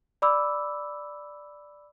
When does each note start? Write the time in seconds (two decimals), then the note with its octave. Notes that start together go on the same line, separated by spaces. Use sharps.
0.22 D5 B5 D6 E6